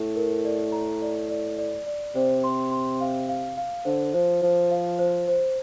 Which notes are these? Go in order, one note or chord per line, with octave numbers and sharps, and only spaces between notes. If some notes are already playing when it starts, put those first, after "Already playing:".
Already playing: A2
A#4
D5
A#5
D5
D5
D5
D5
C3 C5
C6
C6
F5
F5
F5
D3 C5
F3 C5
F3 C5
F5
C5
C5